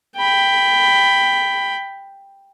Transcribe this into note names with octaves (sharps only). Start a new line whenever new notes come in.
G5 B5